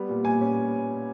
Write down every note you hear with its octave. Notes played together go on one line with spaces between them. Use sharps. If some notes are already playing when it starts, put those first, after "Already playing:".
Already playing: G3 B3
A#2
A#2 G#5
C#4